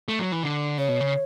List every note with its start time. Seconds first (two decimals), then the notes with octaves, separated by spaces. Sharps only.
0.08 A3
0.19 F#3
0.32 E3
0.43 D3
0.78 C#3 C#5
0.89 B2
1.01 C#3